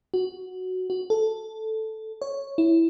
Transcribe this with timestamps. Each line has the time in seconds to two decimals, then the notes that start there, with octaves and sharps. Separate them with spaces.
0.14 F#4
0.90 F#4
1.10 A4
2.22 C#5
2.58 E4